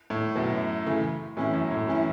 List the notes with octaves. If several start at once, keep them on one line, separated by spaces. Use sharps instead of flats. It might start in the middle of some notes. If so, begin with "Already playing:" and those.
A2
F#2 B2 F#3 B3
C#3 E3 A3
A2 E3 C#4 E4
F#2
A2
E3 C#4 E4